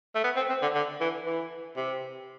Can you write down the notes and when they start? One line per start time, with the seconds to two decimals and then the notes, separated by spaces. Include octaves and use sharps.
0.15 A3
0.24 B3
0.36 C4
0.49 C4
0.62 D3
0.74 D3
1.00 E3
1.26 E3
1.77 C3